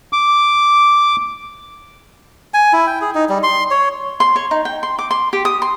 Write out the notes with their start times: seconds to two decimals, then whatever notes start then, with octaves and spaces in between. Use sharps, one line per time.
0.13 D6
2.54 G#5
2.73 E4
2.87 G5
3.01 G#4
3.15 D#4
3.29 G3
3.43 C6
3.71 C#5
4.20 C6
4.36 C#5
4.51 D#4
4.65 G5
4.83 C6
4.99 D6
5.11 C6
5.33 G4
5.45 D#6
5.62 C6